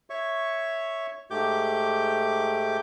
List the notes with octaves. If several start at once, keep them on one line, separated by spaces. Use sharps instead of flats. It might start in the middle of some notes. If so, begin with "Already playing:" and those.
C#5 E5 C#6
G#2 A3 G4 D6 G6